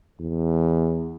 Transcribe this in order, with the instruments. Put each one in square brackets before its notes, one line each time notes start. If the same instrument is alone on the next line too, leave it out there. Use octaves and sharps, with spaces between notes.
[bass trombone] E2